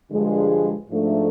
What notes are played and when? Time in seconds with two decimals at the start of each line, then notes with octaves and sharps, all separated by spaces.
0.10 G2 D3 F3 G#3
0.89 G#2 F3 A3 D4